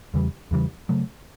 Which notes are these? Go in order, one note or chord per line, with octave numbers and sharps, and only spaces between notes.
E2 C#3 E3 G3
E2 C#3 E3 G3
C#3 F#3 A3